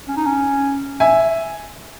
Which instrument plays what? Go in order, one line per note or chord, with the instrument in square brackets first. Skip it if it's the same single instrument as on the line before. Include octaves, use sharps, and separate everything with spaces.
[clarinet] C#4
D#4
C#4
[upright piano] E5 G#5